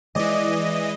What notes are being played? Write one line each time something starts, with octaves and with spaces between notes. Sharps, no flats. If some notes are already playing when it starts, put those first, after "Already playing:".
E3 G#3 D5 D#5